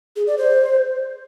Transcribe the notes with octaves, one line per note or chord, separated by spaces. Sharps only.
G#4
D5
C5